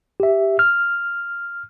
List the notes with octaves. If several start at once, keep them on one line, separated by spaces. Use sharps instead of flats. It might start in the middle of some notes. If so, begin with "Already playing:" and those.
G4 E5
F6